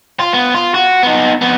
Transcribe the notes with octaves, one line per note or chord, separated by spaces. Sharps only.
F4
B3
F4
F#4
B3 D#4
F2 B3